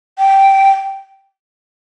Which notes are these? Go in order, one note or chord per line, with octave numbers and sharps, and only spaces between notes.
G5